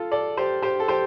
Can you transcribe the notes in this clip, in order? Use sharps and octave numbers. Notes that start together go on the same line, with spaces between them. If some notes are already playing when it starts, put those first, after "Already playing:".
Already playing: F4 A4
A4 D5
G4 C5
G4 C5
A4
G4 C5